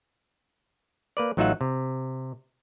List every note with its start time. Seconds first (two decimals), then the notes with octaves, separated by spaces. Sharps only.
1.17 A#3 B4 D5
1.37 A1 F#3 D#4 F4 E5 F#5
1.61 C3